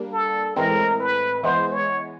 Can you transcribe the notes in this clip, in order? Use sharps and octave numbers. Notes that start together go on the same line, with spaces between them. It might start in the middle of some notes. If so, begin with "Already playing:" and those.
Already playing: G3 A#3 D4
A4
A2 E3 G#3 C4 A#4
B4
E3 G#3 B3 C5
C#5